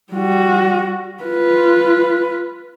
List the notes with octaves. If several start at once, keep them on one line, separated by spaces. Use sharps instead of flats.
G3 F#4
F4 B4